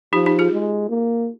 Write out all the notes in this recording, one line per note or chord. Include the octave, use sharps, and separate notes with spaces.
F3 D#4 G4
D#4 G4
F4 G#4
G#3
A#3